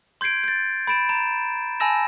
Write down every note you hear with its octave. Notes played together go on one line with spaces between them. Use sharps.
C6 G6 G#6 C7 D7
G6 A6
B5 A6 D7 E7
A#5 E7
G#5 A5 B5 E6 A#6 E7